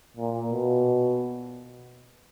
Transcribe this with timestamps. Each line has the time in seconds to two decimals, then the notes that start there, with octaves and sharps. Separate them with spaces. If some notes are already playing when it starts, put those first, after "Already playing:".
0.17 A#2
0.50 B2